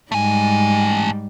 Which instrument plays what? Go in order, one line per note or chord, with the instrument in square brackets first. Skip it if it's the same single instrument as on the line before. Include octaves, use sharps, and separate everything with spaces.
[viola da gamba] G#2 G3 [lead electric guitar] A3 G#5